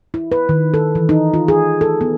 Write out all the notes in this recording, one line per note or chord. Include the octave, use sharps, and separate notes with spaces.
E4
B4
D#3
A4
E3
D#4
F4
G#4
A4
B3